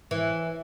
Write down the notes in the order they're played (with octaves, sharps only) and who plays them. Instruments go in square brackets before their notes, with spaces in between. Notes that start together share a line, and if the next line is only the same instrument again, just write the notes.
[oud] E3